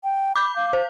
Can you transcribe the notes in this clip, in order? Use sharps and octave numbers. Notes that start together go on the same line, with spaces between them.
G5
B5 D6 G6
F5
C5